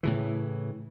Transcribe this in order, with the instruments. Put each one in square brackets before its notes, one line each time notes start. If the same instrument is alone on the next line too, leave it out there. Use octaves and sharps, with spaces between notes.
[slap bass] A2 C#3 E3